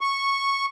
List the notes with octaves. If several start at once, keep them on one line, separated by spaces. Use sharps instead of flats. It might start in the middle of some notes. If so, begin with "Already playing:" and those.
C#6